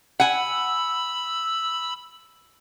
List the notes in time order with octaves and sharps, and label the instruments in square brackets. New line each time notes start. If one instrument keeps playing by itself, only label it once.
[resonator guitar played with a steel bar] F#5 G#5 [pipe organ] B5 E6